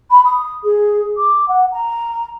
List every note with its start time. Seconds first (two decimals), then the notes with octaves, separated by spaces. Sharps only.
0.10 B5
0.25 D#6
0.63 G#4
1.17 D6
1.48 F#5
1.71 A#5